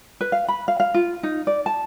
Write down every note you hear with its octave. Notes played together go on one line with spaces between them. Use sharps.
B4
F5
B5
F5
F5
F4
D#4
D5
A5